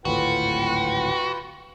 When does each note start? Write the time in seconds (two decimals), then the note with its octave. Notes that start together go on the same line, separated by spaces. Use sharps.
0.05 D1 G#1 A2 F4 F#4 B4 G5